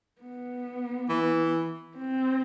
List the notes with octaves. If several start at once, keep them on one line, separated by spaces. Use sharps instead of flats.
B3
E3
C4